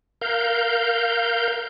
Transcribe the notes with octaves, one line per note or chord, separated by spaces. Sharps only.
A#4 F5 G6